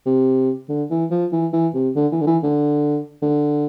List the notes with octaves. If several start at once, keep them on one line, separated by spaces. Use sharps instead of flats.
C3
D3
E3
F3
E3
E3
C3
D3
E3
D3
E3
D3
D3